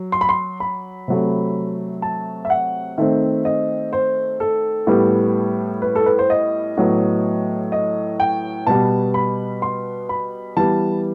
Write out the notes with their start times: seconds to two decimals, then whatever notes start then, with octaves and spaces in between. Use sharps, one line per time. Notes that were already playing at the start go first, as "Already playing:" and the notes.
Already playing: F#3
0.12 C6
0.21 B5
0.29 C6
0.60 B5
1.08 C3 F#3 A3
2.02 A5
2.45 E5
2.50 F#5
2.98 D#3 A3 C4 E5
3.45 D#5
3.93 C5
4.40 A4
4.87 A2 G3 B3
5.82 B4
5.95 A4
6.06 B4
6.19 C5
6.30 D#5
6.77 A2 F#3 B3
7.72 D#5
8.20 G5
8.67 B2 G3 B3 A5
9.14 B5
9.62 C6
10.09 B5
10.57 E3 G3 B3 A5